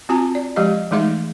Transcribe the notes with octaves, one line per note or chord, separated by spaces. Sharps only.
C4 F4 F#4 G#5 A5
D5
F3 G#3 G4 D#5
E3 G#3 A3 D#4 G#4 E5